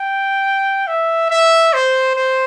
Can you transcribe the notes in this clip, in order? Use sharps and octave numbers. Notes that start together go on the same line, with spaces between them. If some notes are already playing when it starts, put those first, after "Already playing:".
Already playing: G5
E5
E5
C5
C5